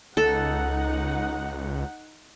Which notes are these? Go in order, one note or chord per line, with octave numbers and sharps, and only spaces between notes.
C#2 D#4 A4 F#5